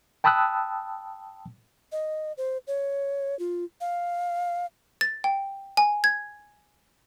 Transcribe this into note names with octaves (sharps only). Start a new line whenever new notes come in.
G5 A5 B5 D#6 E6 F#6
D#5
C5
C#5
F4
F5
A6
G5
G#5
G#6